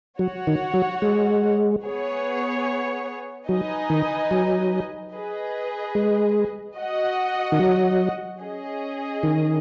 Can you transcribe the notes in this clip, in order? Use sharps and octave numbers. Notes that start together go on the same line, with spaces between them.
F#3 F#4 C#5 F#5
D#3
F#3
G#3
B3 G#4 C#5
F#3 D#4 B4 D#5 G#5
D#3
F#3
G#4 B4 D#5
G#3
F#4 D#5 F#5
D#3
F#3
C#4 G#4 D#5
D#3